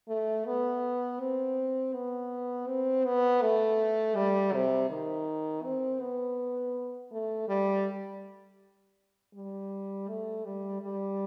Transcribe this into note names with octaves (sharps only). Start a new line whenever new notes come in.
A3
B3
C4
B3
C4
B3
A3
G3
C3
D#3
C4
B3
A3
G3
G3
A3
G3
G3